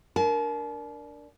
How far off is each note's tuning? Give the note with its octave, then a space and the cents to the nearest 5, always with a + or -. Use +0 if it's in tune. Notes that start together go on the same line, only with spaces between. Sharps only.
D4 +0 A#4 +0 A5 -45